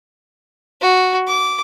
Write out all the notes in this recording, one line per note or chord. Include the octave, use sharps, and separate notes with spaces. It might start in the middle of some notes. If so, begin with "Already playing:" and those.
F#4
D6